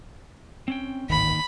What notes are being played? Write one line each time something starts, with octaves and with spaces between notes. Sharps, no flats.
C4 C#4 G5
D1 G#1 D#2 D#3 B5